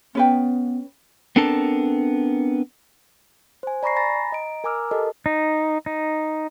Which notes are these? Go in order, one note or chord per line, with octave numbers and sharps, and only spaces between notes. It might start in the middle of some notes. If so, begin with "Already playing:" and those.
B3 C#4 B4 G5
B3 C4 D4 A4 A#4 A5
C5 G#5
D5 A#5 B5 C#6 A#6 C7
G#5 A#5 B5 A6 A#6
D#5 A#5 D7
A#4 G#5 A#5 D6 E6 F6
G4 A4 A#4 D#5 A5
D#4
D#4